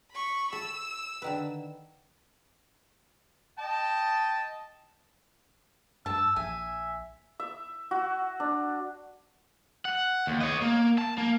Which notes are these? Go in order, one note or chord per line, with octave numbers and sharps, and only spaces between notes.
B5 C#6
A4 E6
D3 D#3 B4
D#5 G5 A5
G2 A5 E6
A#1 E5 G#5
E5
F#4
D4
F#5
D#2
C#5 D#5
A#3
A5
A#3